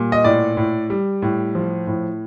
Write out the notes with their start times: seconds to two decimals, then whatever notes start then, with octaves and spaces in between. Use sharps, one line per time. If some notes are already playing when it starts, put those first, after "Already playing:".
Already playing: A#2 G3
0.12 D#5
0.24 A2 D5
0.57 A2
0.90 G3
1.22 A2
1.55 F3
1.87 A2